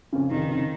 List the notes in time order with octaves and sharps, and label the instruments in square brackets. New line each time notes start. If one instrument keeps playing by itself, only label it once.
[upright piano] F2 C#3
[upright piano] F1 [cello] D#3
[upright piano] F2 C#3